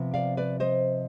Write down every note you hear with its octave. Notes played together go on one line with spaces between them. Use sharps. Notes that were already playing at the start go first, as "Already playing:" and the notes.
Already playing: C3 F3 B3
D5 F5
B4 D5
C5 D#5